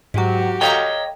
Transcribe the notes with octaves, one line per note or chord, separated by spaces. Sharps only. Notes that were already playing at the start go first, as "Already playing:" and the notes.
G#2 F#3 F#4 G4
A4 C#5 D#5 F5 G5 A#5